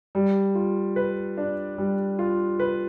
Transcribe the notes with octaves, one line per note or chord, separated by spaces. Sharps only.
G3
F4
B4
D4
G3
F4
B4